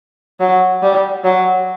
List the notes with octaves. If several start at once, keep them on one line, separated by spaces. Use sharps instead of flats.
F#3
G3
F#3